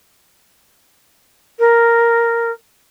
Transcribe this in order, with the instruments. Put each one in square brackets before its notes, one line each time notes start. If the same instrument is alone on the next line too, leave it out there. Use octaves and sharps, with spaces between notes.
[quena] A#4